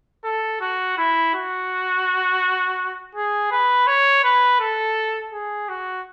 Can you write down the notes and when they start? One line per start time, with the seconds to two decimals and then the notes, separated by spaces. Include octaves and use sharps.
0.24 A4
0.61 F#4
0.97 E4
1.34 F#4
3.15 G#4
3.51 B4
3.87 C#5
4.24 B4
4.60 A4
5.33 G#4
5.69 F#4